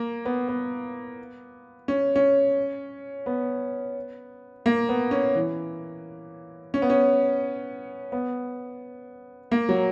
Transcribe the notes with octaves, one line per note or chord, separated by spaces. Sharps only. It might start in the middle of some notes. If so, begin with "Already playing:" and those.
Already playing: A#3
B3
B3
C#4
C#4
B3
A#3
B3
C#4
E3
C#4
B3
C#4
B3
A#3
F#3